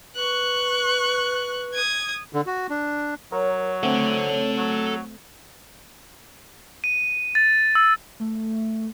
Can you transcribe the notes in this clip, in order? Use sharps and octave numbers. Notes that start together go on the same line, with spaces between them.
B4 C#6 F#6
D#6 G#6
D3
F#4
D4
F#3 A#4 C#5
A3 C4 A4 F#5
F#3
D#7
A6
E6
A3